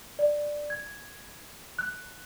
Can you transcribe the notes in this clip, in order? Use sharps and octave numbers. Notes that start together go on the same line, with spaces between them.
D5
G#6
F#6